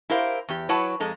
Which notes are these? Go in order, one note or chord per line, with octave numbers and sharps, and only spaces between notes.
E4 G4 A#4 C5 F5
E2 G4
F#3 E4 B4 C#5 F#5 A5
F2 G#3 A4 A#5